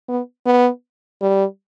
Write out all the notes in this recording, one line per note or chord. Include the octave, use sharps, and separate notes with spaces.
B3
B3
G3